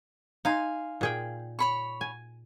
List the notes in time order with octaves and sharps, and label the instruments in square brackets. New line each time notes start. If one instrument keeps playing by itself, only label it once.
[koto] D#4 [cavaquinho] F5 G#5 C6
[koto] A#2 G#4 G5
[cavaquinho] C#5 B5 C#6
[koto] G#5